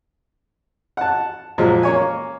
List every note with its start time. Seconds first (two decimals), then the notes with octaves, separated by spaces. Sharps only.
0.97 F#5 A5
1.58 A#2 F3 F#3 G#3
1.83 A#3 C#5 G#5